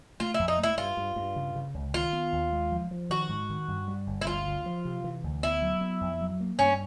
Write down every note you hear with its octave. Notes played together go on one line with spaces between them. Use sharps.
A3 F4
F2 E4
D#4
A3
E4
G2 F4
G2
G2
C#3
C#3
C#2
D#3 F4
B3
D#2
G#3
F3
F3
D#3 F#4
G#2
D#3
G2
G3
G1
E4
D2 F4
D3
F3
C3
E3
D2
B3 E4
F#3
B3
F2
F#3
A#3
G2 C#4